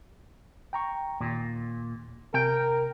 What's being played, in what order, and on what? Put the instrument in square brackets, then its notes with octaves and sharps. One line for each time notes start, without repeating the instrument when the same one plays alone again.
[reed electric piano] G5 A#5 C#6
[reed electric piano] D#2 [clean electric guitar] A#2
[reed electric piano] C3 [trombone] A#4 [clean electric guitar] G5